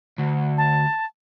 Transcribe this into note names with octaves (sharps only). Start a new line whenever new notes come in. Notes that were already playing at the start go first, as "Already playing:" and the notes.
D2
A5